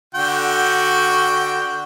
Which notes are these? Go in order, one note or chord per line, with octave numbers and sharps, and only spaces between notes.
D3 F#4 G5